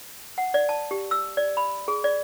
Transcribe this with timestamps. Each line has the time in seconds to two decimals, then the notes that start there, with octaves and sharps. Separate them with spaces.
0.38 F#5
0.54 D5
0.69 A5
0.91 G4
1.11 E6
1.37 D5
1.57 B5
1.88 G#4
2.04 D5